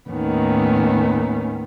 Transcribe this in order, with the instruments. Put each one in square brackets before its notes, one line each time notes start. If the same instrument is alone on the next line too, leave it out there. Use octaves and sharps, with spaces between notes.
[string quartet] D#2 A2 D#3 B3 C#4